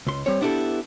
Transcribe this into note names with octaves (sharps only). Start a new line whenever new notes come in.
C#2 C6
G3 C4 C#5
B3 D4 E4 F#4 G4 A4